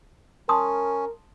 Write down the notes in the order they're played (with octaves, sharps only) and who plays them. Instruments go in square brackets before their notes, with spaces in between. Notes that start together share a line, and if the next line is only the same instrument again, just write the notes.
[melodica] C#4 [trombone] A#4 [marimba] A5 [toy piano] C6 D#6